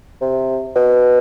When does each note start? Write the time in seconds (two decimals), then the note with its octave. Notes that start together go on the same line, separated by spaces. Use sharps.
0.21 C3
0.76 B2